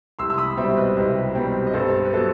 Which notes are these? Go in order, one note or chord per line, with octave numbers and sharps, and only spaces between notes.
C2 C6 E6
E6
B5 D#6
B2 G3 C4 C5 E5
B4 D#5
C2 B4 D#5
B2 G3 C4
D#5
G2 A4 C5
B4
F#3 B3 A4 C5